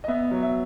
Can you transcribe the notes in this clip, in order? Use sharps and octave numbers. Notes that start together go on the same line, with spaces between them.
D#5
B3 E5
F#3
E5